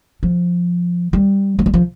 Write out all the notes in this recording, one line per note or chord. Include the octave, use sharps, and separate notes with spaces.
F3
G3
F3
G3
F3